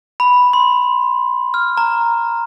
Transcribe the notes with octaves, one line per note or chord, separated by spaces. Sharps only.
B5
C6
F6
A#5